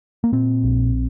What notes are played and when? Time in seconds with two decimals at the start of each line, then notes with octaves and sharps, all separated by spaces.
0.24 A#3
0.32 A#2 C4
0.63 A#1